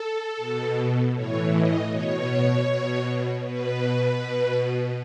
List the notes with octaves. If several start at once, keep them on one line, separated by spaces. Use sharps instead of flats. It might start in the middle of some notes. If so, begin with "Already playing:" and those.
Already playing: A4
B2
A2 E3 C#5
D#5
B2 C#5
B2
B2 B4
B2